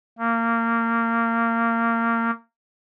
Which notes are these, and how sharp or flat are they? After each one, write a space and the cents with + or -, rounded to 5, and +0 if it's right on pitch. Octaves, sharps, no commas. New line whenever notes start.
A#3 -20